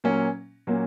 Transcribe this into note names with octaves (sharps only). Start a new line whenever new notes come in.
A#2 F#3 A#3 C#4
A#2 F#3 A#3 C#4